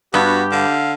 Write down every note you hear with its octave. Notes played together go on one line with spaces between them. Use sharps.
G2 B3 F#4 G4
D3 F5